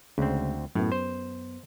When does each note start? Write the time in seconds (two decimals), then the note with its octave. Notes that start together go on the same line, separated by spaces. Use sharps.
0.18 D2 C#3 G#3 C4
0.75 F#2 A2 B3
0.92 C5